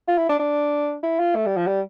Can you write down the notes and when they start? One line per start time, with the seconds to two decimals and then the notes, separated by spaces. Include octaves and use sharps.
0.08 F4
0.18 E4
0.29 D4
0.39 D4
1.03 E4
1.19 F4
1.35 A3
1.46 G3
1.57 F3
1.67 G3